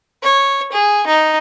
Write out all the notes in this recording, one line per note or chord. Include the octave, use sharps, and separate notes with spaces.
C#5
G#4
D#4